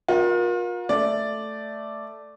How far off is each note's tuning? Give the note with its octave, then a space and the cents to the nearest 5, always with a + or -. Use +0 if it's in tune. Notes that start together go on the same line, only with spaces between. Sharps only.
F4 +40 A#4 +30
A3 +0 D5 +0